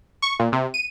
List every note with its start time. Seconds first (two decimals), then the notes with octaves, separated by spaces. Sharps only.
0.22 C#6
0.40 A#2
0.52 C3
0.74 D#7